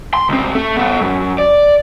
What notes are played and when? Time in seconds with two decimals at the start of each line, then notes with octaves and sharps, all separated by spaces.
0.14 C6
0.29 C#2 C4
0.55 A4 E5
0.77 B3 A4
1.01 F#2
1.38 D5